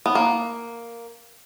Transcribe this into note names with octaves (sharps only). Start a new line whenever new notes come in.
B3
A#3